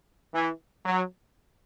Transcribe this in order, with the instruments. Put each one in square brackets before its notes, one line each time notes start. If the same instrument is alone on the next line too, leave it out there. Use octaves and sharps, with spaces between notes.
[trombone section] E3
F#3